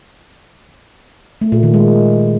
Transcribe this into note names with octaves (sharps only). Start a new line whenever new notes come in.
A3
A#2
D#3
G#3